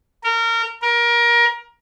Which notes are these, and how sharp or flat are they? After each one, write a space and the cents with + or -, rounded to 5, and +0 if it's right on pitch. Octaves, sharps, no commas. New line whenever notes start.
A#4 -25
A#4 +25